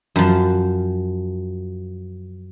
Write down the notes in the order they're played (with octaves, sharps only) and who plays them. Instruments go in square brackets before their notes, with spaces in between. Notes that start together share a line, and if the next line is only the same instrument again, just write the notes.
[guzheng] F#2 F3